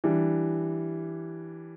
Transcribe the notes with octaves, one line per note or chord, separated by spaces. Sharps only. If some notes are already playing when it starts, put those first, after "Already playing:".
E3 G3 D4